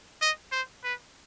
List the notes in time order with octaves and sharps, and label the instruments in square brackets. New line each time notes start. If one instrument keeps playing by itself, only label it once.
[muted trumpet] D#5
C5
B4